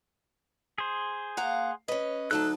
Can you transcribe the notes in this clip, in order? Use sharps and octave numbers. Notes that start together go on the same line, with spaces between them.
G#4 C5
A#3 F5 F#5 A#5
C#4 B4 D#5
D2 F#3 D#4 A4 A5 F#6